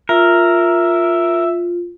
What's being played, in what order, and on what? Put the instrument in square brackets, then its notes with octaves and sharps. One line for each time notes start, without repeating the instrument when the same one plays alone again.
[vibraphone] F4 [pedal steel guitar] A#4 [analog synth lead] E5